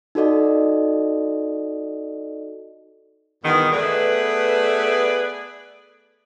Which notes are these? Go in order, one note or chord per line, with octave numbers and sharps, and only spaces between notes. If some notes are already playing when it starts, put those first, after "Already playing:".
D#4 F#4 A4 D5 D#5
E2 G2 B2 D#3
A3 B3 G#4 B4 D5